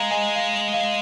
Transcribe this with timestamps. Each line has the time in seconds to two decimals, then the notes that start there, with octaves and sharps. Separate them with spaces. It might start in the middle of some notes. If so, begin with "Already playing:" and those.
Already playing: G#3 F5 A#5
0.11 D#5 G#5
0.36 F5
0.74 F5